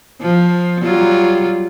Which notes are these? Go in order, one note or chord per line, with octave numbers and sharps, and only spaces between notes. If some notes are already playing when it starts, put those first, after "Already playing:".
F3
F#3 G3 F4